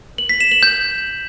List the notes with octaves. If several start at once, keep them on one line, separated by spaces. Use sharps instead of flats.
F#7
B6
E7
F#7
G6